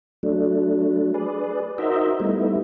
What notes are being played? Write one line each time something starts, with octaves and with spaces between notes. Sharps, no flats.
F#3 A3 D4
G#4 B4 D5
D#4 F#4 A#4 C5 D#5 E5
G3 A3 B3 D#4 E4